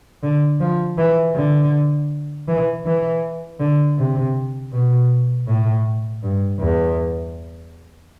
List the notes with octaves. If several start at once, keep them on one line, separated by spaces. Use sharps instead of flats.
D3
F3
E3
D3
E3
E3
D3
C3
B2
A2
G2
E2